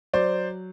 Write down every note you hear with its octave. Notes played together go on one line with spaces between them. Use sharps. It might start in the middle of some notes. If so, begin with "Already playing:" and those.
F#3 C5 D5